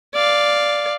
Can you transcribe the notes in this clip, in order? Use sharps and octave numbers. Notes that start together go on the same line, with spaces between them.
D5 F5